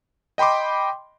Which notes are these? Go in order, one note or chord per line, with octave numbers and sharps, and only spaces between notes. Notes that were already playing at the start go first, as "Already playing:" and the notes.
D#5 G5 B5 C6 D6